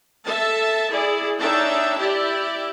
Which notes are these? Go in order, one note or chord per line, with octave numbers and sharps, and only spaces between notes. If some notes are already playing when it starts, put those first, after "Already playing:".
A4 E5 A5
E4 G#4 D5
D4 D#4 C#5 E5 G5 A5
E4 G4 D5 E5